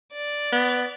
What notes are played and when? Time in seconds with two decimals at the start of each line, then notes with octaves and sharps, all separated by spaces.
0.13 D5
0.53 B3